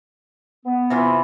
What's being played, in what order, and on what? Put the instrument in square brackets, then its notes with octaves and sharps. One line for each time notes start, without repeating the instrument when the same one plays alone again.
[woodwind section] B3
[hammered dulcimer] C3 E3 F4